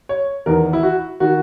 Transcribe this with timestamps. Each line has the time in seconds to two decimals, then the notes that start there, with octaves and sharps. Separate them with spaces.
0.09 C#5
0.46 E2 D#3 A#4
0.73 E4
0.83 F#4
1.20 D#3 F#4